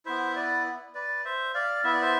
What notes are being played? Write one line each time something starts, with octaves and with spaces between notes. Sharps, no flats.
B3 E4 C5 E5
B4 D5
B4 D5
C5 E5
D5 F5
B3 E4 E5
D5
C5 E5